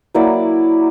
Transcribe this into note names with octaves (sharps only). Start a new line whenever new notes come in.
F#3 A#3 E4 D5